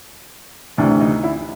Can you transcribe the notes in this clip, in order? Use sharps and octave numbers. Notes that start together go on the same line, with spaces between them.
D2 C3 E3 D4
D#4
E4